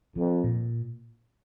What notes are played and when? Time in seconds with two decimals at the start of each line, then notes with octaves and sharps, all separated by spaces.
0.16 F2 F3
0.44 A#2